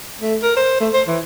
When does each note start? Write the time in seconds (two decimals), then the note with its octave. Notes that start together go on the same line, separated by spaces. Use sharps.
0.21 A3
0.42 A#4
0.57 C5
0.80 A3
0.93 C5
1.07 E3